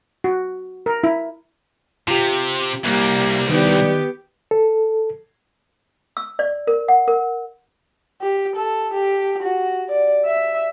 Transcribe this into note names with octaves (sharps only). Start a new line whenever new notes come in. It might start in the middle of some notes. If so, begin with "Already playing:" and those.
F#4
A#4
E4
C3 F4 G4
C2 G3 A#3
D#3 G3 B3 D#4 G4
A4
E6
D5
A#4
F#5
A#4
G4
A4
G4
F#4
D5
E5